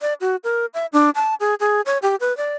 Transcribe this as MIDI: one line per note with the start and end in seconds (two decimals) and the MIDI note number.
0.01 0.14 74
0.21 0.36 66
0.44 0.66 70
0.74 0.86 76
0.93 1.10 62
1.15 1.35 81
1.40 1.55 68
1.60 1.81 68
1.86 1.98 73
2.02 2.16 67
2.20 2.35 71
2.37 2.57 74